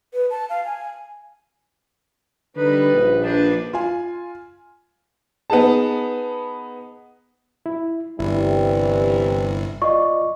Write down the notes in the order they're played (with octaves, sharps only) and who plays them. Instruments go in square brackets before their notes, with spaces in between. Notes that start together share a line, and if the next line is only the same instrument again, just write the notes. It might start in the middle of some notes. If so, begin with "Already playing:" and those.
[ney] B4
A5
F5
G#5
[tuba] D3 [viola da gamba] G3 D#4 [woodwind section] B4
[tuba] A#1
[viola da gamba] D4 D#4 B4 [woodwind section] C5 A5
[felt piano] F4 G#5
[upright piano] B3 D#4 G#4 A5
[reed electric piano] E4
[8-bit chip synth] G1 [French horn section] C3 E3 G3 [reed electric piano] E4
[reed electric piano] F4 D5 [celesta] D#5 C#6